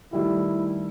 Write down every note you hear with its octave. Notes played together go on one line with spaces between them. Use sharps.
D#3 G3 A3 E4